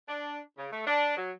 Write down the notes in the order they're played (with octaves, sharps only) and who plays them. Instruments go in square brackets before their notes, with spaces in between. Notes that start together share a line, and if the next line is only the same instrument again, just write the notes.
[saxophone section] D4
C#3
A3
D4
F#3